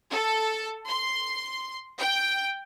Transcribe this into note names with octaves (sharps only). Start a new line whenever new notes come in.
A4
C6
G5